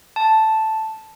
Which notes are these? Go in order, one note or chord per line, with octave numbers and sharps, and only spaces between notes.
A5